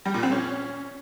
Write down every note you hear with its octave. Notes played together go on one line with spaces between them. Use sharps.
G3
A#2
C4
C#4